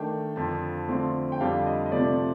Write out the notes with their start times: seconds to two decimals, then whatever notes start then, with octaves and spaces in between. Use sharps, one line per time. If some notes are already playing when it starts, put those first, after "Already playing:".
Already playing: D#3 A3 D4 G5
0.36 F2 D3 F3 A5
0.89 D3 F3 A3 C4
1.32 G5
1.40 F2 D3 G3 D4 F5
1.66 D#5
1.86 D#5
1.92 C3 F3 A3 D5